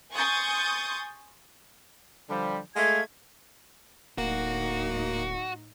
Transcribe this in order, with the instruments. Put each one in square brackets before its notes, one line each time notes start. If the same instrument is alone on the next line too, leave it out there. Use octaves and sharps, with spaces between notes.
[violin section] G#5 C6 C#6 D#6 G6 A6
[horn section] D3 F3 G3
[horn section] G#3 A3 F5 [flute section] G#6
[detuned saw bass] D1 [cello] A2 D#4 [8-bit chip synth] A#3 [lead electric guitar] F#4